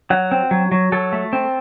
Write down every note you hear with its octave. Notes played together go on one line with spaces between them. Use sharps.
F#3 F#5
C4
F#3
F#3
F#3 A4
A3
C4